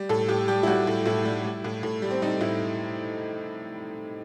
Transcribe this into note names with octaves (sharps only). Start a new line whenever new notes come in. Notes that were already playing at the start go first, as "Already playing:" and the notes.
Already playing: G3
A2 A4
A2 G4
G3 G4
E4
G3 F#4
A2
A2 E4
G3
G3
A2
A2
G3
C4
G3 D#4
A2 E4